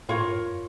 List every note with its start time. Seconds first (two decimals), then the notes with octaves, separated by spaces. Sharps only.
0.09 A2 F4 A#4 C#5
0.22 G2
0.36 F2